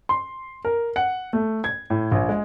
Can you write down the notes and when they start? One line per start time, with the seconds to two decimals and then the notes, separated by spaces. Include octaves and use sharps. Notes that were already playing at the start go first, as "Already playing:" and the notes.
0.09 C6
0.65 A#4
0.96 F#5
1.33 A3
1.64 G#6
1.90 A2
2.12 A#1
2.29 G#3